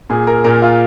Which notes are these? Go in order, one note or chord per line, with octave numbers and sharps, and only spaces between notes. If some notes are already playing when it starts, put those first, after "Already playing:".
A#2 G#4
A#4
A#2 A#4
F4